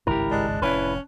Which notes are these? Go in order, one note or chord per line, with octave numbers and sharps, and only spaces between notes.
G#1 C#2 G2 E4 G4 A#4
G#3 D5 A5 F#6
F1 A2 C#4 E4 B4